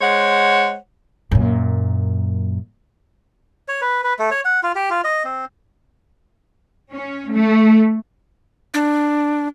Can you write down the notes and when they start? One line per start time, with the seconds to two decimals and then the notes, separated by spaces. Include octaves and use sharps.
0.01 G#3 C5 C#5 F#5
1.31 F#2 A#2
3.68 C#5
3.81 B4
4.04 B4
4.19 A3
4.31 C#5
4.45 F#5
4.63 F4
4.75 G4
4.90 F4
5.04 D#5
5.25 C4
6.93 C#4
7.31 A3
8.74 D4